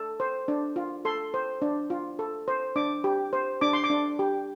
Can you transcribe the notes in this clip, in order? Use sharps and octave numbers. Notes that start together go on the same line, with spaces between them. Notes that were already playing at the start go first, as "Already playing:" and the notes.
Already playing: A4
C5
D4
F4
A4 C6
C5
D4
F4
A4
C5
D4 D6
G4
C5
D4 D6
C6
D6
D4
G4